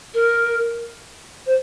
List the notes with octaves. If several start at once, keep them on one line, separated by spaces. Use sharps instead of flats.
A#4
C5